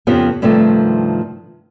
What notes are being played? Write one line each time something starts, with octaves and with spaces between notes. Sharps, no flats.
F2 C#3 F3 B3 G4
G2 C3 D#3 F3 A3